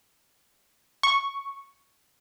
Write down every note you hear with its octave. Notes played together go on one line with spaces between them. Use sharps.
C#6